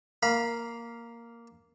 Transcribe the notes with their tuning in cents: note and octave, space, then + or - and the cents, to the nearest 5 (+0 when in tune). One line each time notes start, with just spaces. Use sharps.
A#3 +0 F5 +0 B5 -30